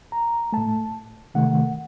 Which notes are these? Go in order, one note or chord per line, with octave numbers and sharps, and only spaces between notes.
A#5
A2 A3 A5
C3 D#3 A3 F#5